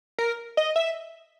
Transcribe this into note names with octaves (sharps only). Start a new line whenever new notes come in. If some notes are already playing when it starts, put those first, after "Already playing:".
A#4
D#5
E5